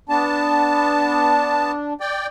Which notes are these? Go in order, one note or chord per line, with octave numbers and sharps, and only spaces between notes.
B3 D4 A5
D5 G5